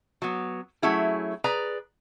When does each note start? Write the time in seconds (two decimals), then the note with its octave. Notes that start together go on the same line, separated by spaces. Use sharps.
0.22 F#3 B3
0.82 F#3 A3 C#4 E4 G#4
1.44 G#4 B4 D5 A#5